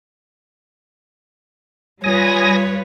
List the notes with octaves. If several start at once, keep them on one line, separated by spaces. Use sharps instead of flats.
G3 F4 B4 C#5 G#5 D#6 A#6